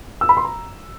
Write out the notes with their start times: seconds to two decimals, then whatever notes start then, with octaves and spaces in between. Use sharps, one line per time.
0.21 E6
0.29 B5
0.37 C6
0.45 A#5